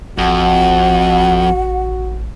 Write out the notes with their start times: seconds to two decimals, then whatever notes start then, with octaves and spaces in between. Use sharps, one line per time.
0.18 A1 F2 F#4 F#5